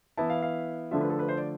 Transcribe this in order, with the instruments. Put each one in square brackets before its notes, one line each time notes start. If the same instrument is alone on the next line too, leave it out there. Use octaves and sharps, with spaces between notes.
[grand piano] E3 B3 E4 A5
F5
F5
D3 F3 A3 D4 F4 E5
B4
A4
B4
C5
D5